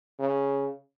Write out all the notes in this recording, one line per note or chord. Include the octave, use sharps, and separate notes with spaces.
C#3